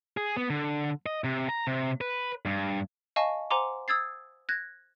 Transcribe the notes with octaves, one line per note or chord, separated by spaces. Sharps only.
G#4
B3
D3
D#5
C3
A#5
C3
B4
G2
D#5 F5 G#5 A5 C#6
C5 F#5 G#5 A#5 C6 D6
D#6 E6 G#6 A6 C7
F#6 G#6 A#6